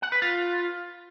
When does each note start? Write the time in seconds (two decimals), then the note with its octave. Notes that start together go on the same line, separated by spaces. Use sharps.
0.02 F#5
0.12 B4
0.22 F4